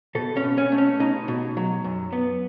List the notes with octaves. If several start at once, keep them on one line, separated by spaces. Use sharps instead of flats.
B2 A4
C#4
B2
C#4
A3
C#4
B2 D#4
B2
F#3
F#2
B3